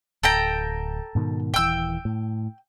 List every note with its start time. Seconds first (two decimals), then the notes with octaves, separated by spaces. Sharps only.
0.23 D1 A4 G5 A#5
1.15 G#2 B2 D#3
1.54 D#1 E3 G5 E6
2.05 A2